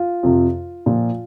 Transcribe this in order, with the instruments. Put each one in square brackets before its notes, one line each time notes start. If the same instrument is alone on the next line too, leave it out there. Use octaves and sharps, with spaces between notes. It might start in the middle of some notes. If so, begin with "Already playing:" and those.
Already playing: [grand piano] F4
F2 C3 F3
A#2 F3